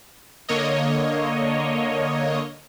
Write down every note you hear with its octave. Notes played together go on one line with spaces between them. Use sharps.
D3 A#3 C#5 D#5